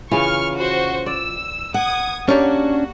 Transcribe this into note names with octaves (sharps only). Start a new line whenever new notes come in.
C#3 E3 F4 C#6 F6
F#4 C5
D5 E6
F#5 D#6 G#6
A#3 C#4 D4 F#4 G4 C#5 D5